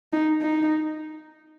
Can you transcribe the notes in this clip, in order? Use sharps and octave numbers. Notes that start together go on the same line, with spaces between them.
D#4
D#4